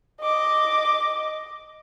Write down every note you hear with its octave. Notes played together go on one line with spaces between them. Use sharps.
D#5 D6